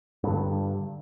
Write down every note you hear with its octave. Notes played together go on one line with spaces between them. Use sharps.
G2 D3